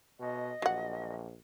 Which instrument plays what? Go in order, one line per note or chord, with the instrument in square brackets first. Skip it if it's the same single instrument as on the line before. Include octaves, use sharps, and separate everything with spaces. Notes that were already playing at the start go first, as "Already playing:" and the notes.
[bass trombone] B2 [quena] D#5
[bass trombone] A#1 [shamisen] F#3 F#5